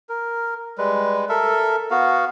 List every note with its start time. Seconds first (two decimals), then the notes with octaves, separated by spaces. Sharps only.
0.09 A#4
0.78 G3 G#3 B4
1.29 A4 A#4 E5
1.91 B3 F#4 F5